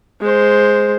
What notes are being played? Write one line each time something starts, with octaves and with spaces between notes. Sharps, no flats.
G#3 C5